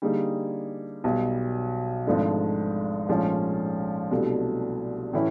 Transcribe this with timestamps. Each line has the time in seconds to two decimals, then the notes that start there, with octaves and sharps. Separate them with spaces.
0.02 D3 G3 A#3 D#4 G#4
1.04 B1 B2 G3
2.07 G#1 G#2 F3 A3 D4
3.09 A#1 G#2 F3 A3 C#4
4.11 C2 B2 F#3 A3 D4
5.13 A2 E3 A3 C#4 E4